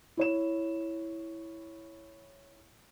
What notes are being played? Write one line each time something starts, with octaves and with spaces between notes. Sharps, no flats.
E4 C#5 E7